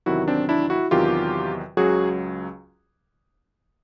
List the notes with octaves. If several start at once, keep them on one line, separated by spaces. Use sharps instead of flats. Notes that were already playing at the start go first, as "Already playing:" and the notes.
E2 C3 D#3 F#3 E4 F#4
C4 D4
D4 E4
E4 F#4
E2 C3 D#3 F#3 F4 G4
C#2 C#3 F#3 F#4 G#4